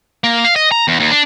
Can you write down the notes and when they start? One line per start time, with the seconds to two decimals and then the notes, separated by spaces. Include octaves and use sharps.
0.24 A#3
0.44 F5
0.56 D#5
0.72 A#5
0.88 E2
1.00 D#2
1.11 D4